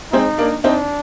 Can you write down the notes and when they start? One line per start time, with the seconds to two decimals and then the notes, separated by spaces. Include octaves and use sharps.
0.12 G#3 C4 D#4
0.38 A#3 D4
0.64 C4 D4 D#4